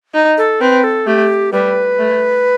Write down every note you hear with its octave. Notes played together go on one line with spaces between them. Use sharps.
D#4
A4
C4 B4
A4
A3 G4
G3 B4
A3